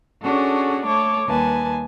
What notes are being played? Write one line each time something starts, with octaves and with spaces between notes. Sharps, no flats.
C#4 D4 F#4 G#4 A4
A3 A4 C#5 D6
D#2 G3 B4 G#5 A5